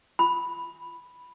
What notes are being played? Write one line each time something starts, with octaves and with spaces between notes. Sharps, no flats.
B5